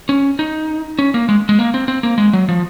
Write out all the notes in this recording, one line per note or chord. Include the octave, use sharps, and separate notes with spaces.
C#4
D#4
C#4
A#3
G#3
G#3
A#3
C4
C4
A#3
G#3
F#3
F3